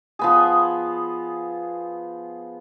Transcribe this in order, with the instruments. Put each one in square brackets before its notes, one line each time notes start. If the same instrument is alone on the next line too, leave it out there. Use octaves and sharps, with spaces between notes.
[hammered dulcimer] F3 B3 G#4